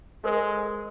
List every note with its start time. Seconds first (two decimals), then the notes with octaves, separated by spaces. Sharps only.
0.24 G#3 A4 A#4 C5